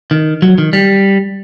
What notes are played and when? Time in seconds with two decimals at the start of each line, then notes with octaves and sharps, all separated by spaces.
0.11 D#3
0.42 F#3
0.58 D#3
0.73 G3